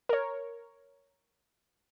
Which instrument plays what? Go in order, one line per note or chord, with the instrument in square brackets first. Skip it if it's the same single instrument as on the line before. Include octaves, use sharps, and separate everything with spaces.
[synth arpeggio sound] A#4 C#5